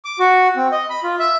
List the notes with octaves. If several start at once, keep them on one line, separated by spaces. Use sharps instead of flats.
D6
F#4
C4
D#5
B5
F4
E5